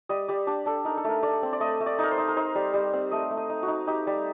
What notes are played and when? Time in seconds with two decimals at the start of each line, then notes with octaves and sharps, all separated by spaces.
0.09 G3 D#5
0.28 G3 D5
0.47 D4 G4
0.66 D4 A4
0.85 D#4 A#4
0.97 A4
1.04 A3 A#4
1.23 A3 D5
1.43 C4
1.53 D5
1.60 A3 D#5
1.80 A3
1.86 D5
1.99 D#4
2.04 A#4
2.11 C5
2.18 D#4
2.28 A#4
2.37 D#4 C5
2.55 G3
2.74 G3
2.93 C4
3.11 A3 D#5
3.31 A3
3.37 D#5
3.50 D#4
3.63 F#4
3.68 D#4
3.87 D#4 G4
4.07 G3